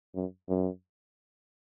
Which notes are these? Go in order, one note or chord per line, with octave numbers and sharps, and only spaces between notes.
F#2
F#2